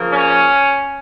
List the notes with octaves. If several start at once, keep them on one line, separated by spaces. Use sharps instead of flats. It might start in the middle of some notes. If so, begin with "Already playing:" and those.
Already playing: C#3 F3 A#3
C#4